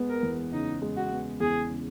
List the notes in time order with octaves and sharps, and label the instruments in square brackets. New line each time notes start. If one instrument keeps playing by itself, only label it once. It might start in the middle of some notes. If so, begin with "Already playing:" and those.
Already playing: [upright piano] G#3 B3
[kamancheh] A#4
[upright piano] E2
[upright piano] C#3 [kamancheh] D#4
[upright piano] G#3
[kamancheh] F#4
[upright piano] B3
[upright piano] E2 [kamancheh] G#4
[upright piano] C#3